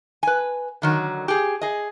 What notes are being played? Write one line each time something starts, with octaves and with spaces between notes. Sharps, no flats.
B4 G#5
D3 D#3 F#3
G4 G#4
G#4 D#5